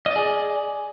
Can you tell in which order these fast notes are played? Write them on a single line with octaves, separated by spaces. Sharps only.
D#5 D5 G#4